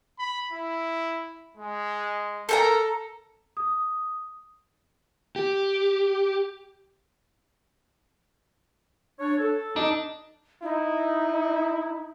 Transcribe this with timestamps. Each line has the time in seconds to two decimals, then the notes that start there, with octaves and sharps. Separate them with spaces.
0.19 B5
0.52 E4
1.57 G#3
2.49 A4 A#4 A5 A#5
3.57 D#6
5.36 G4
9.19 D4 C#5
9.39 A4
9.76 D4 D#4
10.63 D#4 E4